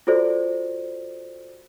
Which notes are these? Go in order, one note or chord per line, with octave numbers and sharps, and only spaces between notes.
F4 F#4 A4 C5 D5